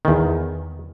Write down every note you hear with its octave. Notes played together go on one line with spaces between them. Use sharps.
E2 D#3